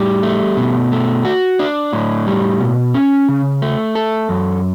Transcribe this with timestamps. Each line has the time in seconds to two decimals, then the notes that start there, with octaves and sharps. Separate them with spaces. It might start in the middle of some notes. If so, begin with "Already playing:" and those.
Already playing: A2 G3
0.23 A3
0.57 B2
0.92 A3
1.25 F#4
1.59 D4
1.93 A2
2.27 G3
2.60 B2
2.94 C#4
3.28 C#3
3.62 A3
3.95 A4
4.29 F#2